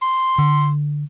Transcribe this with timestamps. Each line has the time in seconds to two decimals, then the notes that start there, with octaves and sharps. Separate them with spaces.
0.02 C6
0.38 D3